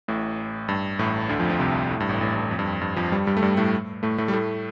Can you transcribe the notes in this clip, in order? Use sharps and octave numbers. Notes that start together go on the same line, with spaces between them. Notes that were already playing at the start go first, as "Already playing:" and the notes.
A1 A2
G2
A1 A2
D2 D3
F2 F3
F2 F3
C2 C3
A2
G2
A1 A2
A1 A2
G2
F2
G2
F2
G2
F2 F3
G2 G3
G2 G3
A3
G2 G3
A2 A3
A2 A3
A2 A3
G3
A2 A3